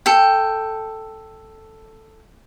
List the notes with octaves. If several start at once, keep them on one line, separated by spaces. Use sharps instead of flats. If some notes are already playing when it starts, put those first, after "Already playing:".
A4 G5